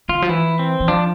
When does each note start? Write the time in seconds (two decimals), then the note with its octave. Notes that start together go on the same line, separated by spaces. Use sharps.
0.09 D3 F4
0.22 F3
0.29 E3 E4
0.59 C4
0.80 E3
0.88 F3 D4